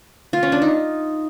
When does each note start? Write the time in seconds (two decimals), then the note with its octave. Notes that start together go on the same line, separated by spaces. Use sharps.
0.33 F4
0.43 C#4
0.52 D4
0.62 D#4